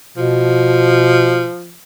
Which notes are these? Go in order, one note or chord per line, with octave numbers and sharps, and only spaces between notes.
B2 F3